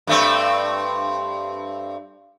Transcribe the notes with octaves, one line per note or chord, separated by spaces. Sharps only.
G2 A3 C4